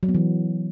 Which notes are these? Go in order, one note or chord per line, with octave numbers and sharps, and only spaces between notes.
F#3
B3
E3